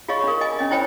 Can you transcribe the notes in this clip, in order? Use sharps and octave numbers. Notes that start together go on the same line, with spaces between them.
F4 G#4 C#5 D#5 F5 C#6
D4 A#4
D#5 G#5 D6
C#4 D#5
E4 C5 C#5 G5 G#5 B5